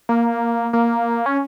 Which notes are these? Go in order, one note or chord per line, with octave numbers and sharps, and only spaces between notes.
A#3
A#3
C#4